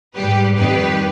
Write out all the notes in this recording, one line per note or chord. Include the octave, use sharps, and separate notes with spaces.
G#2 G3 G4 B4
F2 D#3 G3 G4 B4